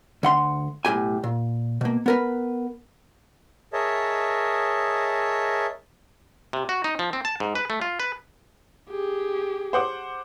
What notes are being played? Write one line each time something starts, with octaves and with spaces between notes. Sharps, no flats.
D2 F#5 C6
B1 A2 G4 G#5
A#2
B2 A#3
B3 A#4 B4
G#4 A#4 C#5 D#5 E5 A5
C3
F#4
D#4
F3
C4
A5
G#2
B4
A3
F4
B4
G4 G#4
C5 F#5 D6